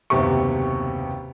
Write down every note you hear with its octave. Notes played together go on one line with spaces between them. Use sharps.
F#1 D#2 C3 B3 G4 C#6